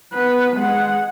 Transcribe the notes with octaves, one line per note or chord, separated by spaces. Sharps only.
B3 B4
G#3 F#5